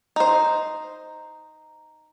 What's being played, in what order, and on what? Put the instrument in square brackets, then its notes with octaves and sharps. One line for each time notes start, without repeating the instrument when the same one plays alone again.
[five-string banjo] D#4 C5